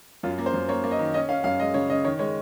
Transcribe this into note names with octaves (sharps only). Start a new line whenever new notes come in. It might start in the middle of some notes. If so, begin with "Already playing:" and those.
F#2 F4
A#3
C5
F#2
A#3 C#5
A#3
D#5
D#3
C#4 D#5
C#4 F5
F#2 F5
G#3 D#5
C#3 C#5
C#3 D#5
D#3 C#5
G#3 C#5